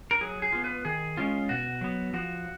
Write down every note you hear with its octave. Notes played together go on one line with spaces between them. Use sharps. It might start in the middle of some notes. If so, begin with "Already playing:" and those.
A#4
F#3 G#4
G#4
B3 F4
B4
D#3 G#4
G#3 C#4 F4
B2 F#4
F#3 B3
F3 F#4